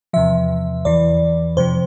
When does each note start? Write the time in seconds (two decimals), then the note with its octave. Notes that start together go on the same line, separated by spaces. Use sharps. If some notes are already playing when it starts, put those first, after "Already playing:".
0.13 E2 C3 F3 E5
0.85 E2 E3 D5
1.57 F2 C3 F3 C5